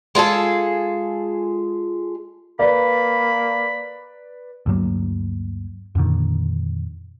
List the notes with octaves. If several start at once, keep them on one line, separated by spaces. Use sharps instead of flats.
G#3 F4 G#4 A4
A#3 B4 D5 B5
D2 G2 F#3 A#3
F2 A#2 D3 D#3